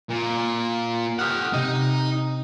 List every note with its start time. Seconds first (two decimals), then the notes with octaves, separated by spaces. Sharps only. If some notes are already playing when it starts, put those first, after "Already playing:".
0.10 A#2
1.19 G4 F#5 G5 D#6 F6
1.54 C3 D#4